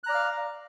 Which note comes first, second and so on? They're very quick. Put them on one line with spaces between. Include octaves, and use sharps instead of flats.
F#6 A#5 D5 F6 F5